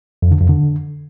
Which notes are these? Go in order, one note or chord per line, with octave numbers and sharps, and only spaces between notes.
F2
D3
F2
D3